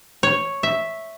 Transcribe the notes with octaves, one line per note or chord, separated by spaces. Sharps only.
C#5
E5